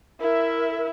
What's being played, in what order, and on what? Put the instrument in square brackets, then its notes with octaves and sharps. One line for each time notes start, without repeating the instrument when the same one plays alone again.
[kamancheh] E4 E5 [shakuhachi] A#4